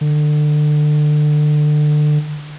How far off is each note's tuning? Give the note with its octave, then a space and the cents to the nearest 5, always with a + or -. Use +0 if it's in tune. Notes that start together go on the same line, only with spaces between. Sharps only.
D3 +30